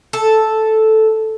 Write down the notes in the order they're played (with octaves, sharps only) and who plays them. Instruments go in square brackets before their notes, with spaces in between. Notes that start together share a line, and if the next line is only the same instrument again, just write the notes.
[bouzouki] A4